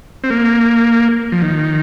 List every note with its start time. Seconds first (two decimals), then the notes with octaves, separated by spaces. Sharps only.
0.24 C4
0.30 A#3
1.32 F3
1.42 D#3